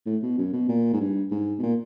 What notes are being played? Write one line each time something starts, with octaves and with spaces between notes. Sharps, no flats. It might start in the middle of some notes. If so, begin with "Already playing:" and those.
A2
B2
F#2
B2
A#2
G#2
G2
G#2
B2
A#2